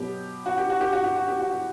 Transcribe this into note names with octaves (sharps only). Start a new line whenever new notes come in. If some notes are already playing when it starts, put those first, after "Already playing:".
Already playing: B2 F#3 B3 G4
F#4
G4
F#4
G4
F#4
G4
F#4
G4
F#4
G4